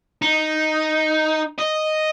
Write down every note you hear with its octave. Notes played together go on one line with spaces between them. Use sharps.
D#4
D#5